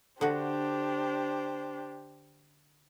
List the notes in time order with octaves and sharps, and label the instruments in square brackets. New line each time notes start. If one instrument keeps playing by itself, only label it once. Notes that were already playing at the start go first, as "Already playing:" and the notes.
[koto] D3 F#4 [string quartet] D4 G4 C5